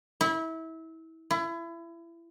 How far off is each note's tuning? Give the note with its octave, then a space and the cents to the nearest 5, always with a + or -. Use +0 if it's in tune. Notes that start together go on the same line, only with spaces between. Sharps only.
E4 -25
E4 +30